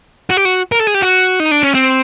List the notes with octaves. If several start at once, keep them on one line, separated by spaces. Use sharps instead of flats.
F#4
G4
F#4
A#4
A4
G#4
G4
F#4
D#4
D4
C#4
C4